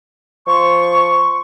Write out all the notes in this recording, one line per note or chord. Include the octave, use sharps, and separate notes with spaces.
F3 C6 C#6